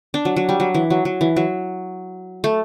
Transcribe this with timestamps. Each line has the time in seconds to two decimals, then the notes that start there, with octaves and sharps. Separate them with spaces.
0.14 D4
0.25 F#3
0.36 F#3
0.49 G3
0.60 F#3
0.74 E3
0.90 F#3
1.05 F#3
1.21 E3
1.36 F#3
2.44 A3